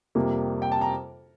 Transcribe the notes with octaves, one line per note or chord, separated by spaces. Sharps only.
F2 C3 G3 A#3
G5
A5
A#5